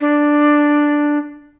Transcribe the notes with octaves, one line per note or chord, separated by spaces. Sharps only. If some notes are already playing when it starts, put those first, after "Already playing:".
D4